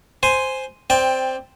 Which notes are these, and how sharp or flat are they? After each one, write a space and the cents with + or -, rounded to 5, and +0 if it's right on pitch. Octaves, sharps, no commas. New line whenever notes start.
C5 +0 G#5 +0 C6 +0
C4 +0 D5 +0 G5 +15